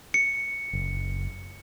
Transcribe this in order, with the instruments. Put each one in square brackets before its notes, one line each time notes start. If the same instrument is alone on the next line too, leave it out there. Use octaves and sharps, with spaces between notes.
[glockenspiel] C#7
[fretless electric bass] F#1